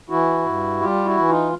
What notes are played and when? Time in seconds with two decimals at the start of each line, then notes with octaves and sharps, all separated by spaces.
0.10 E3 E4 F#4
0.46 G2
0.81 G3 F4 G4
1.05 E4 F#4
1.17 E3
1.29 D#4 F4